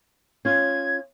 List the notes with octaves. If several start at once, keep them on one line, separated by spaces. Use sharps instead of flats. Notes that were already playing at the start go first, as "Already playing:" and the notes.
C#4 F4 G#6